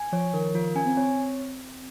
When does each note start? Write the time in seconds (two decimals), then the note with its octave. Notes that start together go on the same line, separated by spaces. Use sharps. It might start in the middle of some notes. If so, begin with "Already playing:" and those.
Already playing: G#5
0.12 F3 C#5
0.33 D#3 A#4
0.54 F3 F4
0.75 C#4 G#5
0.86 C4
0.97 C4 C#5